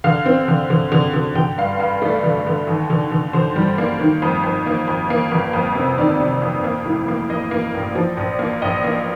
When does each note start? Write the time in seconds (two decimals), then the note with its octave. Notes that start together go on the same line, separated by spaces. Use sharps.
0.04 D3 F5
0.26 C4
0.48 D3
0.70 D3
0.92 D3
1.13 D3
1.35 D3 G5
1.58 G2 F5
1.80 G2 F5
2.02 A3 D5
2.23 D3
2.47 D3
2.67 D#2
2.90 D3
3.11 D3
3.33 D3 C5
3.56 G3
3.78 A#3
4.00 D#3
4.22 F2
4.43 F2
4.66 A#3
4.88 F2
5.10 A#3
5.32 G1
5.53 F2
5.75 C3
5.98 D#3 D5
6.20 C3
6.42 F2
6.64 A#3
6.85 A2
7.08 A#3
7.30 A#3 D#5
7.51 A#3
7.74 A#1
7.95 F3
8.17 A#1
8.39 A#3
8.62 A#1 D#5
8.84 A#3